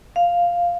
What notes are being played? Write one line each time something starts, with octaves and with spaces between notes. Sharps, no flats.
F5